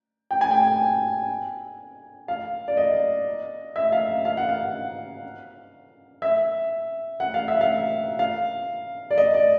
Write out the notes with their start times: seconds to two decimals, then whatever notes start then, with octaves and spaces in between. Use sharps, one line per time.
0.31 G5
0.41 G#5
0.51 G5
2.28 F5
2.68 D5
2.77 D#5
3.76 E5
3.92 F5
4.25 F5
4.37 F#5
4.49 F5
6.22 E5
7.20 F#5
7.34 F5
7.48 E5
7.61 F5
8.19 F5
9.11 D5
9.18 D#5
9.34 D5